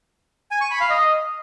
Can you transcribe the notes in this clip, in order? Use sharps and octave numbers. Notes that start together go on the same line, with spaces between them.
G#5
C#6
B5
F5
D#5